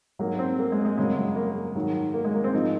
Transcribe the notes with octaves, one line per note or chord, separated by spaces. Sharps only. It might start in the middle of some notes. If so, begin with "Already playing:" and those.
G#2 F#3 A#3
C4
A#3
G#3
G#3
F#2 C#3 F#3 G#3
G#3
A#3
G#2 D#3 F#3
A#3
G#3
A#3
C4
G#2 F3 D#4